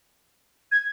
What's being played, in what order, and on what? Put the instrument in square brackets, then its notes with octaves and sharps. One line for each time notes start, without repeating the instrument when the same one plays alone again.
[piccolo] G#6